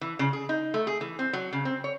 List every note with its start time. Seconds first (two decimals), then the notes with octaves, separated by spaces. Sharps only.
0.01 E3
0.19 C#3
0.33 G#4
0.49 D#4
0.74 A3
0.87 G#4
1.01 E3
1.19 C4
1.33 F#3
1.53 C#3
1.65 C4
1.84 C#5